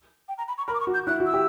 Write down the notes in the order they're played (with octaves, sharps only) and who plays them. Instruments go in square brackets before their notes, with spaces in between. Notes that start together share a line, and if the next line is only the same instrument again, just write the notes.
[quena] G5
A#5
B5
C#6
[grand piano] A#4 [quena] B5
[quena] D6
C#6
[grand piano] F#4
[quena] G6
[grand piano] E4 [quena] F#6
[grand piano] F#4
[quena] E6
[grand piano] G4